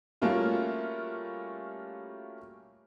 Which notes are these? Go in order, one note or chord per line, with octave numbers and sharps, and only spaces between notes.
G3 A3 A#3 C#4 F4 F#4